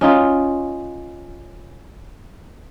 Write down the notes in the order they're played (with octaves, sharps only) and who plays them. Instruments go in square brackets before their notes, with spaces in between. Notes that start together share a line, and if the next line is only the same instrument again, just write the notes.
[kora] C#4 D#4 F4